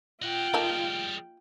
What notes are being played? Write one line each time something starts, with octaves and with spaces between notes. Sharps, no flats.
F4 D#5 F#5 G5
G3 A#3 D#4 G#4 A4